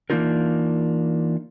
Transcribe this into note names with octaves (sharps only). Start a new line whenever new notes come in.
E3 A#3 D4 D#4 F4 A#4